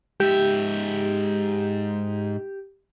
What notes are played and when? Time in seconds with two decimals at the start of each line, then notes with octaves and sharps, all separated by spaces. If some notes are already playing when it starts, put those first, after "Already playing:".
0.20 G#2 G4 E5